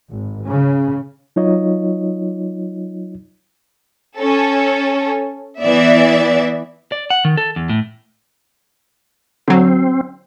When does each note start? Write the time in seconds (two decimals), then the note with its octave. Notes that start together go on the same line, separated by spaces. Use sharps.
0.10 G#1
0.50 C#3
1.36 F#3 D#4 F4 C#5 D#5
4.17 C#4 A4
5.61 E3 B3 D5 E5
6.92 D5
7.10 F#5
7.25 D#3
7.37 A4
7.56 E2
7.69 A2
9.48 D3 F#3 C4